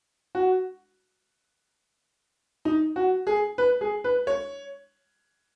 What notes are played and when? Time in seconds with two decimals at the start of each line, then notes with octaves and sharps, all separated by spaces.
0.35 F#4
2.65 D#4
2.96 F#4
3.27 G#4
3.58 B4
3.81 G#4
4.04 B4
4.27 C#5